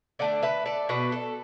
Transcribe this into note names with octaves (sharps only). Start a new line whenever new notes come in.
D3 A3 D4 D5 F#5
B4 E5
A4 D5
B2 B3 D4 F#4 B4
A4